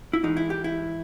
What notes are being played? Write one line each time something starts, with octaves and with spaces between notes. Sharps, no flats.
E4
G#2 E3 G#3 D#4
E4
G4
E4